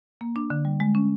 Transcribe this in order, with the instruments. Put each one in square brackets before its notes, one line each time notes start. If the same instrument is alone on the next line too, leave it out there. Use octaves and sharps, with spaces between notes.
[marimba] A#3
D4
D3
G3
G#3
C#4